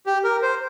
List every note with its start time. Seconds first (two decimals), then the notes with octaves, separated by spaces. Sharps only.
0.06 G4
0.24 A#4
0.42 C5